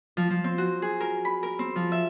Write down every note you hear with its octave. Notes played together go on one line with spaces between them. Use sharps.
F3
F3
C4
F#4
G#4
A#4
B5
A#4
C4
F3
E5